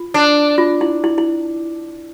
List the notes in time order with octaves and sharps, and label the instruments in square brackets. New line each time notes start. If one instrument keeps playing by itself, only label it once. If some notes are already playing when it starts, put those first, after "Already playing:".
Already playing: [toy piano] F4
[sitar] D4
[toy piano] F4
E4
E4
E4